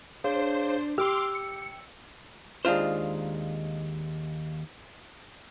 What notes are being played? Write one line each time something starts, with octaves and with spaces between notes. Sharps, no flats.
D4 G#4 C5 C#5 F5
G4 G5 C6 D6 E6 F6
C#7
D#2 G#3 D4 F4 C5